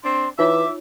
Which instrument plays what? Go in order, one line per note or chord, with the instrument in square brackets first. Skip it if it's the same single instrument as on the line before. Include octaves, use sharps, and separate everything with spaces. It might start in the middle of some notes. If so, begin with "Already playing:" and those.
[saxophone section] C4 D4 [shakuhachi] C6
[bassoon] E3 [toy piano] D#4 F4 C#5 [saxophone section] E5 [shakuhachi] D6